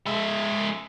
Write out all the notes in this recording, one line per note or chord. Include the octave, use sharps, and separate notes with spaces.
G#3 E5